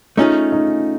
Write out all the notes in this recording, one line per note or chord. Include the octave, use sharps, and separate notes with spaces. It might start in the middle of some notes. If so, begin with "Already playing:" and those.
A3 C#4 D#4 F4 G#4
D#4